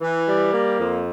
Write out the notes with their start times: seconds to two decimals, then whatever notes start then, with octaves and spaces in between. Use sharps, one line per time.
0.01 E3
0.27 G3
0.53 A#3
0.78 F2